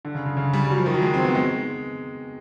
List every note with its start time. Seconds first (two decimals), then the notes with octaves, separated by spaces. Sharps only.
0.05 D3
0.15 C#3
0.26 C#3
0.37 C#3
0.53 G3
0.70 F#3
0.78 F3
0.86 D#3
0.94 F#3
1.02 G#3
1.14 C4
1.25 B3
1.35 G#3